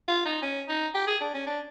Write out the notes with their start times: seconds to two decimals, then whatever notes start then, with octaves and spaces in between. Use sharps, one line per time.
0.08 F4
0.26 D#4
0.42 C#4
0.68 D#4
0.95 G4
1.07 G#4
1.21 D4
1.34 C#4
1.47 D4